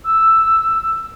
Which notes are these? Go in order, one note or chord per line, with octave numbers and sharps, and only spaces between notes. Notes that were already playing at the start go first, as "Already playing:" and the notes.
E6